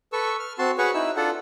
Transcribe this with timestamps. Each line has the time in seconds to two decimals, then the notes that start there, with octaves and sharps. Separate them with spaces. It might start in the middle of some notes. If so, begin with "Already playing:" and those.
0.13 A4 B4 C#6 E6
0.39 F6
0.59 C4 F#4 A5 C6
0.78 F#4 G#4 B4 C#5 F#5 C#6
0.94 D#4 E4 E6
1.16 D4 F4 A4 F#5